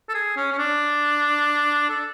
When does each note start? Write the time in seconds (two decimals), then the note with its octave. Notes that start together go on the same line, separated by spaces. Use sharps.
0.09 A4
0.14 G#4
0.36 C#4
0.52 C#4
0.58 D4
1.89 A4